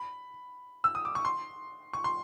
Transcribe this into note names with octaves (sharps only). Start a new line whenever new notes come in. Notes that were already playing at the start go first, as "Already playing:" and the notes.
Already playing: B5
E6
D#6
D6
C#6
C6
C#6
C6